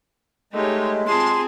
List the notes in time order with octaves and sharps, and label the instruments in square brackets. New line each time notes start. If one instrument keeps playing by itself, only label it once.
[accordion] G#3 [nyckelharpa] A3 G4 [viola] D#4 C#5
[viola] C4 G#4 [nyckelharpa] F4 A5 [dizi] C6